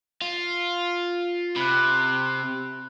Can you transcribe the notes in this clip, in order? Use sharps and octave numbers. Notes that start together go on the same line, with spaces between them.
F4
C3 B5 F#6